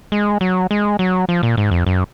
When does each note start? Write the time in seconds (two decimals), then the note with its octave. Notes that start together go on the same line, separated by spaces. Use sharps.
0.12 G#3
0.41 F#3
0.71 G#3
0.99 F#3
1.29 F3
1.43 A#2
1.57 G#2
1.71 F2
1.86 F#2